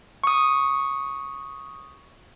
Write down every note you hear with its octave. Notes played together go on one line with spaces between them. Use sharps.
C#6 D#6